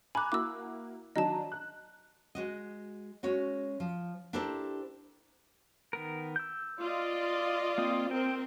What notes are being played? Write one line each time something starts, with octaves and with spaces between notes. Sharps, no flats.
G#5 A#5 B5 D6 F#6
A#3 E4 F#4 D6 E6
D#3 F#3 D4 D#5 A5
F#6
G#3 F#4 D#5
G#3 C#4 F#4 C#5
F3
D4 E4 G4 A4 A#4 C5
D#3 B3 A#4
E6 G6
F4 D5 D#5
A#3 C4 D#6
C4 A#4 G5